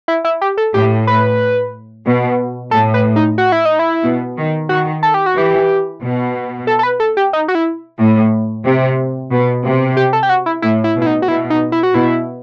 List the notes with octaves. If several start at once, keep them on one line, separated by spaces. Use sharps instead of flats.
E4
E4
G4
A4
A2 G4
B4
B2
A2 A4
B4
D#4
F#4
E4
D#4
E4
B2
D#3
D#3 F#4
A4
G4
F#4
E3 G4
B2
A4
A4
B4
A4
G4
D#4
F#4
E4
A2
C3
B2
C3
G4
A4
G4
F#4
E4
A2 E4
E4
B2
E4
D#4
F#4
B2 E4
D#4
E4
F#4
B2 E4